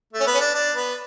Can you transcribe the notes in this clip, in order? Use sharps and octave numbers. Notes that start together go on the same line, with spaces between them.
A3
C#4
B3
C#4
D4
D4
B3